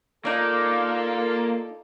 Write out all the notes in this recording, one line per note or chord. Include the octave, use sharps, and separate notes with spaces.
A#3 D#4 F4 A4 D5